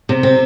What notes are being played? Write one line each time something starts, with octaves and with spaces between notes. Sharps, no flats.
C3
C4